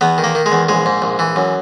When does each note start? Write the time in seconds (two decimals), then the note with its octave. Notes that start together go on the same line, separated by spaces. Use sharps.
0.01 E2 B3
0.18 D#3
0.24 A#3
0.35 D#3
0.46 G#3
0.52 E2
0.69 A#1 G#3
0.86 G#2
1.02 A#1
1.19 E3
1.36 F#2